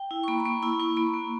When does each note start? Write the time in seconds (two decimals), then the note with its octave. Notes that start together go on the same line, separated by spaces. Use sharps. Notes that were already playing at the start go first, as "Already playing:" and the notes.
Already playing: G5
0.11 E4
0.23 C#6
0.28 A#3 B5
0.40 B5
0.45 A#3 C#6
0.62 E4 B5
0.80 E4 C#6
0.97 A#3 B5
1.14 A#3